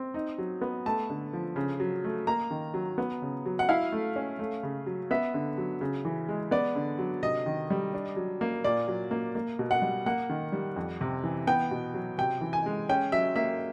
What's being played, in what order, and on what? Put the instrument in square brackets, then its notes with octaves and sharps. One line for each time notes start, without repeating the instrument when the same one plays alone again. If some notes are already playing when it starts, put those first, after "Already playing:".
Already playing: [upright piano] C4
D#4
F#3
B3
A3 A5
D3
F3
C#3
F#3
A3
A#3 A#5
D#3
F#3
B3
C#3
F#3
F#5
E4 F5
A3
C#4
A3
C#3
F#3
B3 E5
D3
F#3
C#3
E3
G#3
B3 D5
D3
F#3
C3 D#5
D#3
G3
D4
F#3
A#3
A#2 D5
F#3
A#3
A#3
B2
F#5
G3
A#3 F#5
D#3
G3
F2
C3
E3
B3 G5
B2
F#3
C3 G5
E3
G#5
G#3
C#4 G5
F#3 E5
A#3 E5